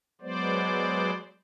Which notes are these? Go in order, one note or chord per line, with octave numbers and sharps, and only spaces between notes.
F#3 G#3 B3 C5 D5